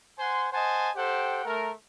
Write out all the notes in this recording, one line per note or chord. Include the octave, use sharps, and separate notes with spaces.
C5 F#5 G#5 C6
C5 D#5 F#5 G#5 A5
G4 A4 C5 F#5 G5
A3 A#4